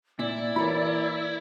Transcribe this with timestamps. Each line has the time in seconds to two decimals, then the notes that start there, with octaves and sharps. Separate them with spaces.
0.19 A#2 E4 D5
0.56 E3 A#3 C#5 B5